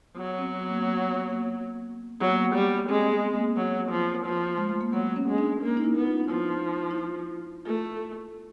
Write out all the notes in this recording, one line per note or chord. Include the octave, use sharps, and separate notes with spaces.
F#3 B3
C4
B3
A#3
B3
A#3
B3
A#3
F#3 B3
A#3
B3
G3
G#3 C4
C4
B3
A#3
F#3
F3
F3
G#3
A3
A#3
F#3 B3
C#4
G#3
D4
A#3
D#4
E4
B3
F4
D#4
F3 E4
E4
F4
A3 F4